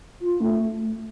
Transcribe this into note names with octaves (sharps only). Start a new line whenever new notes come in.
F4
A3